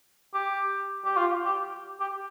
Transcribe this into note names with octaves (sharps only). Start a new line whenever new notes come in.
G4
G4
F4
G4
G4